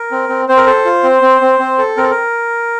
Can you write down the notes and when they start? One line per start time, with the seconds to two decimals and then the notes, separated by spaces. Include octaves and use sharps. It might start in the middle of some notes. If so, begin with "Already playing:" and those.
Already playing: A#4
0.11 C4
0.29 C4
0.49 C4 C5
0.57 A#4
0.66 A4 C5
0.85 F4
1.03 C4
1.22 C4
1.41 C4
1.59 C4
1.78 A4
1.97 C4 A#4
2.03 A4
2.11 A#4